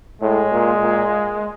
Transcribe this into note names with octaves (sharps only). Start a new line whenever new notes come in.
A2 G#3
A#2
A#2